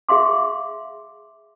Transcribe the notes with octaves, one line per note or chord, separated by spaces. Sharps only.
G#4 E5 F5 C6 D6